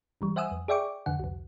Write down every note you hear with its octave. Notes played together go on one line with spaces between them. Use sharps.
G1 E3 G3
C5 E5 F#5 G#5 D#6 E6
F2
G#4 D5 E5 G5 C#6 D6
F2 D3 F#5
C2 F2